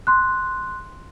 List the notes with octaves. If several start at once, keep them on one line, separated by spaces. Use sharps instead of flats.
C6 F#6